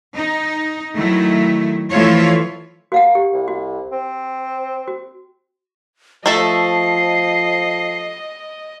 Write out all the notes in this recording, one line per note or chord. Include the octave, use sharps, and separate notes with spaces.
D#4
D#3 F#3 A3 E4
E3 F3 A3 E4 F4 C#5
A#3 F#4 F5 F#5
G4
C2
F#4
C4
F#4
F3 A3 A4 D#5 E5 C7